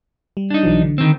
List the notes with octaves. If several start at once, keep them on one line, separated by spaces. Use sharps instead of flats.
G3
D4 D#4
B1 E3 F#3
D3
D#3 C4